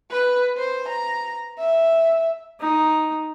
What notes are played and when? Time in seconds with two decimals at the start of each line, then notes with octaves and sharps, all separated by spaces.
0.11 B4
0.57 C5
0.89 A#5
1.59 E5
2.60 D#4